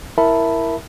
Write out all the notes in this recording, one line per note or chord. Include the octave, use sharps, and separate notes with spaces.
E4 A#4 E5 A5 B5